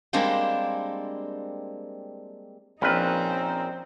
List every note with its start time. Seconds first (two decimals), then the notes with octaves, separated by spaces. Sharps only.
0.13 G3 G#3 A#3 C4 D4 G4
2.82 A#1 F3 C4 C#4 D#4 A#4 B4